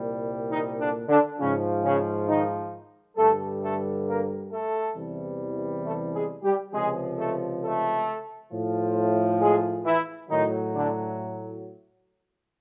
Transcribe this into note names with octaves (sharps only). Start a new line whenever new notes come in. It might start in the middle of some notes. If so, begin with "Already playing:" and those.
Already playing: C2 A#2 G3
D#3 D#4
D3 D4
D3 D4
G#2 C#3 F3 C#4
C#3 C#4
D#3 D#4
G2 D3 G3 A3 A4
A3 A4
A#3 A#4
A3 A4
E2 C3 E3 G3
A3 A4
G#3 G#4
G3 G4
C#2 C3 F3 G#3 G#4
A3 A4
A3 A4
A2 F3
G#3 G#4
E3 E4
A2 D#3 F#3 D#4
D3 D4